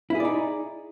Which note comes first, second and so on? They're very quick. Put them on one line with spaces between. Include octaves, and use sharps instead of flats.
E4 G#4 D5 D#4